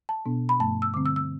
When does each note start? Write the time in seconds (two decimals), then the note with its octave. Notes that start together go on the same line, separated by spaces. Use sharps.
0.09 A5
0.25 B2 B3 D4
0.49 B5
0.59 G2 F3 A3 A5
0.82 E6
0.94 D3 G3 C4 D6
1.06 E6
1.16 E6